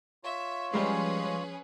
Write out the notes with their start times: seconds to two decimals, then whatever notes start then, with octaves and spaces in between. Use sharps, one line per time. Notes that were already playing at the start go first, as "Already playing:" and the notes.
0.24 F4 C#5 E5
0.74 F3 G3 G#3 C#4 G#4 B4